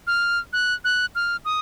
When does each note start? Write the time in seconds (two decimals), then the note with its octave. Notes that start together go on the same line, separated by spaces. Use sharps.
0.07 F6
0.53 F#6
0.84 F#6
1.15 F6
1.45 D#6